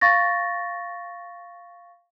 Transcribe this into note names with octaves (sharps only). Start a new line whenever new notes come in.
F5 C#6 A6 A#6